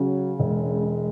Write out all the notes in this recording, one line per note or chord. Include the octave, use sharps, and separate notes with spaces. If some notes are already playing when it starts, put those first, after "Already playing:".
Already playing: C#3 F#3
E1 G#3